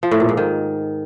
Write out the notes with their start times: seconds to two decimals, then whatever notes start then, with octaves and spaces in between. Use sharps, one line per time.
0.03 F3
0.11 A2
0.20 A#2
0.29 G#2
0.37 D#3